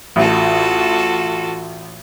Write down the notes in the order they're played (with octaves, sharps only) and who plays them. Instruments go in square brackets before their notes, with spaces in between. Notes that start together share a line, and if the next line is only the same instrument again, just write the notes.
[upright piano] A1 [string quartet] F4 F#4 A4